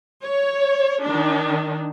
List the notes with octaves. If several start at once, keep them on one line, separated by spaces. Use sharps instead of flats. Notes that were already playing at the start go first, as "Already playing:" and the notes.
C#5
D#3 D4